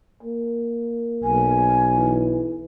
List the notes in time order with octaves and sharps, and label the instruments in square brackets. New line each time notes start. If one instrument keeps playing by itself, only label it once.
[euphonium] A#3
[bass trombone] B1 [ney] G#5
[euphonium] E3